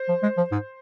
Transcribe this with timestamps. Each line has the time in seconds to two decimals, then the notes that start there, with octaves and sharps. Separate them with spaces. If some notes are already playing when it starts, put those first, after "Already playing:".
Already playing: C5
0.09 F3
0.23 G#3
0.37 F3
0.52 G#2